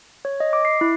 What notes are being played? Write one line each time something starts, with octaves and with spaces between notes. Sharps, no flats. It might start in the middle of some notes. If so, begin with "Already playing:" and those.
C#5
D#5
D6
C7
E4